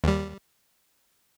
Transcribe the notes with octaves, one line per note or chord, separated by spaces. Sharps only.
D#2 G3